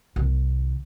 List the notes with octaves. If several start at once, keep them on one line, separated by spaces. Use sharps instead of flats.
C2 D#3